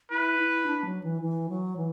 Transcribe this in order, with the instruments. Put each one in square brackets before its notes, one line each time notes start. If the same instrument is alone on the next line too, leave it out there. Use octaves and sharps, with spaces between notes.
[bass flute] E4 [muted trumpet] B4
[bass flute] E4
D4
F#3
E3
E3
F#3
E3